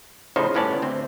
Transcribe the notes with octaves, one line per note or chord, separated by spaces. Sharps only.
A2 C#3 F3 D#4 C5 C#5
G1 A2 B3 C#4 D5 A5
D2 C4